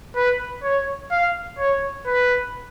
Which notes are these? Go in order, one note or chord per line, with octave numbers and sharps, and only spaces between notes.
B4
C#5
F5
C#5
B4